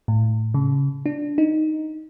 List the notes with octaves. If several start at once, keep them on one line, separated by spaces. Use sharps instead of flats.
A2
C#3
D4
D#4